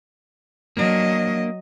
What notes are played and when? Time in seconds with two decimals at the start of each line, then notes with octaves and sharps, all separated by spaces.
0.77 F#3 A#3 D4 D#5